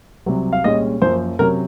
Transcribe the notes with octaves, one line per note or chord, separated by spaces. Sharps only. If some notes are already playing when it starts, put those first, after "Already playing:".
C2 C3 F#3
F5
C2 A#2 G#3 C#4 D#5
F#2 F3 A#3 C#4 C5
C3 F#3 C#4 A#4